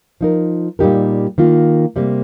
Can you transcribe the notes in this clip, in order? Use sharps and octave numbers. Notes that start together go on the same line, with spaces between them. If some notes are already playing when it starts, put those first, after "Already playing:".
F3 D#4 A#4
A#2 G3 D#4 G4 A#4
D#3 A#3 F4
C3 G3 A#3